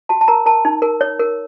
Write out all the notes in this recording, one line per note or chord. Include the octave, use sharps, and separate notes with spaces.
F#4 A5
A5
A#4 A#5
A#4 A5
D#4
A#4
C#5
A#4